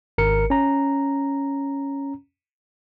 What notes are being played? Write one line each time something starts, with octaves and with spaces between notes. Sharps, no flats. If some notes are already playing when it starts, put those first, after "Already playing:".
G#1 A#4 C#7
C#4 A#5